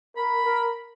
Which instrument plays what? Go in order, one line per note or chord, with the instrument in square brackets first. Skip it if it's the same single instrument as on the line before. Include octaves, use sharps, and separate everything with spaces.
[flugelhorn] A#4 [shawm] B5
[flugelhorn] A#4